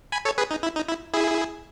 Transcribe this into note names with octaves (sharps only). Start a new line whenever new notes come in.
G#5 B5
A4 C#5
G#4 B4
D#4
E4
D#4
E4
E4 G#4